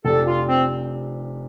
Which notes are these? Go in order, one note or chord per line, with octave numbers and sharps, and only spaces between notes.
F1 F2 F3 D4 G4 A4
F4
C4